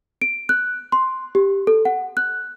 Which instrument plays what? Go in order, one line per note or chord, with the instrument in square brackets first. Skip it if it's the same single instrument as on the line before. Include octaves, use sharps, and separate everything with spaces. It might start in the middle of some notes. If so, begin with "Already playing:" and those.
[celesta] D7
F#6
C6
G4
A4
F#5
F#6